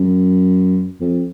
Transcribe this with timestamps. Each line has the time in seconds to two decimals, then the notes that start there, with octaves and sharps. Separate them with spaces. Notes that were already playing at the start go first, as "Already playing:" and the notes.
Already playing: F#2
1.01 F2